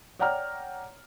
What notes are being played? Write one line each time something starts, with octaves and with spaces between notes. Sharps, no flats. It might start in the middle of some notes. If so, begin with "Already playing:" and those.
C#5 D5 F#5 G5 A#5 F6